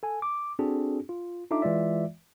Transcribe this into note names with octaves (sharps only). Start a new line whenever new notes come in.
A4 G#5
D6
C4 D4 F#4 G#4 A4
F4
D4 D#4 F4 A4 E5 D6
E3 G#3 F4 D5 E5